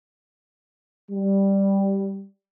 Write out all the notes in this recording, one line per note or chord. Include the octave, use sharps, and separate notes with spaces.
G3